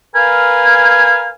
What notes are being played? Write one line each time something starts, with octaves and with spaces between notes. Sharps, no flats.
A#4 B4 F5 G#5